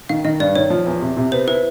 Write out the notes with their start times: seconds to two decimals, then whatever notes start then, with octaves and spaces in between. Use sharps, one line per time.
0.09 D#3 F5
0.25 D#3 D#5
0.40 G2 D5
0.56 D#3 C#5
0.70 F3
0.87 E2
1.02 C3
1.17 C3
1.32 B3 C5
1.47 E4 B4